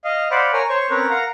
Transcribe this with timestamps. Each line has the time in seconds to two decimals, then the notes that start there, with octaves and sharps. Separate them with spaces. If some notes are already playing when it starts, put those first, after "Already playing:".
0.04 D#5 F5
0.31 C5 D5 F5 F#5 B5
0.53 A#4 C#5 G#5
0.69 C5 C#5 C#6
0.90 C4 C#4 A#4 B4 C#5
1.10 A#4 F5 F#5 A#5